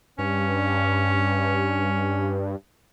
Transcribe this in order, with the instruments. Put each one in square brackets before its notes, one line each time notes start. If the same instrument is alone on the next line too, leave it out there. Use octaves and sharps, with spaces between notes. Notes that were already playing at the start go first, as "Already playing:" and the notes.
[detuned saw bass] G2 [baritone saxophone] C#4